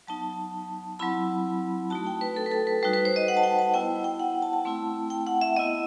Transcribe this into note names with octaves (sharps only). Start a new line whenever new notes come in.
F#3 B3 D#4 A5
F#3 C4 E4 B5
A3 D#4 F#4 A5
G5
B4
A4
B4
A4
B4
G3 D#4 F#4 B4
B4
C5
D#5
F#5
A5
G5
A5
B3 E4 G5
G5
F#5
A5
A5
A3 C4 E4
G5
F#5
E5
B3 E4 D#5